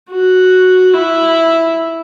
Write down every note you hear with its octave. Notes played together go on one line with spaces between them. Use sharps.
F#4
E4